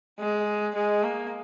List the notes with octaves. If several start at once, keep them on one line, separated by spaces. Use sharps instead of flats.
G#3
G#3
A#3